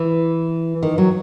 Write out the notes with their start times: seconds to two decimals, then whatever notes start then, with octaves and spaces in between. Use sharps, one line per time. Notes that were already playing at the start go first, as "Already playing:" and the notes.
Already playing: E3
0.83 D#3
0.98 F#3